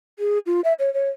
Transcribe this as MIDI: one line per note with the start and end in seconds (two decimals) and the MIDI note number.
0.19 0.39 68
0.46 0.61 65
0.64 0.73 76
0.79 0.93 73
0.94 1.10 73